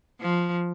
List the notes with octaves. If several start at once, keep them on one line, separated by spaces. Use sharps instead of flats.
F3